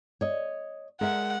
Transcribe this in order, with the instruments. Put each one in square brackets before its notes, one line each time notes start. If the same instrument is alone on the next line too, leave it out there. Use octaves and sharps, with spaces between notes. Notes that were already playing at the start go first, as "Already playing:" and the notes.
[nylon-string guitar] C#5 D#5
[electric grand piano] G#3 [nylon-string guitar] A#4 E5 [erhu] F#5